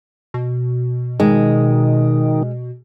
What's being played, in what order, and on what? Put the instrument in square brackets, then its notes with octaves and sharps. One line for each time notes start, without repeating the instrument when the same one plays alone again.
[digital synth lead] B2
[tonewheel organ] D#3 [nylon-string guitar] G#3